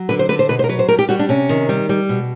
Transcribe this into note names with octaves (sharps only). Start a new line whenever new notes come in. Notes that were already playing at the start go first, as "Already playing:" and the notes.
Already playing: F#3
D3 B4
C5
D3 B4
C5
B2 B4
C5
A#4
F#3 B4
C5
G3 A#4
G4
G3 F#4
D4
C3 C#4
D#3
G3
G3
B2